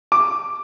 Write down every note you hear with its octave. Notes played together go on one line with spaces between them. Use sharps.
D6